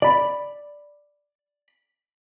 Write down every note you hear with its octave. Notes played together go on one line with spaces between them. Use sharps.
D5 B5